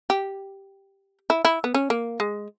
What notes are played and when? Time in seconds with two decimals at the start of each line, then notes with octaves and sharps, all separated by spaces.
0.10 G4
1.30 E4
1.45 E4
1.64 B3
1.74 C#4
1.90 A#3
2.20 G#3